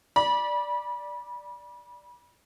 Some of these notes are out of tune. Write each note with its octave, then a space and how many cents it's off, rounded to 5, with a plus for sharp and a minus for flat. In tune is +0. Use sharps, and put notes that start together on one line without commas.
D5 +0 B5 -30